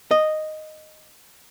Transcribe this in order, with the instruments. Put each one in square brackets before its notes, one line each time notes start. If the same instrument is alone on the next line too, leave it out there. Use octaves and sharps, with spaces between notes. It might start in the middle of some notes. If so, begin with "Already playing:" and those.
[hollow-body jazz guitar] D#5